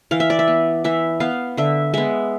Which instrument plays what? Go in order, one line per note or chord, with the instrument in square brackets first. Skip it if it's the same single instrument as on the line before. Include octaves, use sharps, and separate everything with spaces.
[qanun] E3 F5
E5
D5
E5
B3
E3 E5
B3 F5
D3 E5
G#3 B3 E5